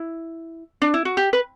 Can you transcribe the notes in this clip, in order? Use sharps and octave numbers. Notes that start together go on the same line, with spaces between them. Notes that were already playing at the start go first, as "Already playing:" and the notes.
Already playing: E4
D4
E4
F#4
G4
B4